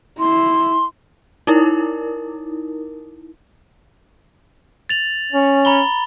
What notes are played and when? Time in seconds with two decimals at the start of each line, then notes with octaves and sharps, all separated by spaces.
0.19 E4 C6
1.47 D#4 E4 A#4
4.89 A6 F7 F#7
5.33 C#4
5.65 A#5 B5 G7